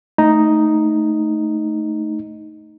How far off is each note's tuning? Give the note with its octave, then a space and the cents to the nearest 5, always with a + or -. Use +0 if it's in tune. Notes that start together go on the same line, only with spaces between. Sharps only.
A3 +0 D#4 +0